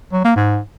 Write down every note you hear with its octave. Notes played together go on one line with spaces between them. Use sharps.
F#3
A#3
G#2